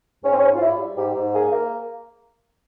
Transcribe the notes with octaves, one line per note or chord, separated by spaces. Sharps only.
G#2 C#4
C4
C#4
G#2
F4
G3 E4
G3
G#2 G4
G#2
A#3 G#4
A#3